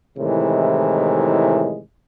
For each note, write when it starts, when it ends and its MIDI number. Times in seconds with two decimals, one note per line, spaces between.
0.18 1.80 45
0.18 1.80 48
0.18 1.80 51
0.18 1.80 52
0.18 1.80 56